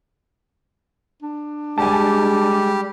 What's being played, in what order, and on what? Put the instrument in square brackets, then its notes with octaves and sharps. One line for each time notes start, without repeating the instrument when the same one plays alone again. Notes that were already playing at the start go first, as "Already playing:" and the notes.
[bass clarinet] D4
[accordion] G3 G4 [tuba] G#3 [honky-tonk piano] G#5 A5